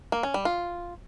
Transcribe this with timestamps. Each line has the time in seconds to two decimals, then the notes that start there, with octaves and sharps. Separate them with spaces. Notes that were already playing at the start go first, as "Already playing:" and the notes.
0.12 A#3
0.23 C#4
0.34 G3
0.45 F4